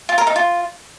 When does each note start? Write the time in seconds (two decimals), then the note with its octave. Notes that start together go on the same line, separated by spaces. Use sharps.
0.09 F4
0.18 A#4
0.27 D#4
0.36 F4